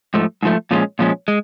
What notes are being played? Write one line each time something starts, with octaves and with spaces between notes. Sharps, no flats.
G#2 F3 A3
G#2 F3 A3
A#2 F3 G#3 C#4
A#2 F3 G#3 C#4
G#3